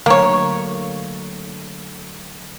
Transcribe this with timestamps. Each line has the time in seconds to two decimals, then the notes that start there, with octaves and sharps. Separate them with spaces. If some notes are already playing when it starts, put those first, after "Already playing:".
0.06 D3 F#3 A3 A#3 C#5